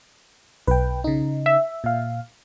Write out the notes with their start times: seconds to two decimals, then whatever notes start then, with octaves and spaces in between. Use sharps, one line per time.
0.67 B1 B4 G5
1.04 C#3 D#4
1.46 E5
1.84 A#2 F5